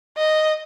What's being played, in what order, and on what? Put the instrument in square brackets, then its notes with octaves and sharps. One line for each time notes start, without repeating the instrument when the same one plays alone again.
[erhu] D#5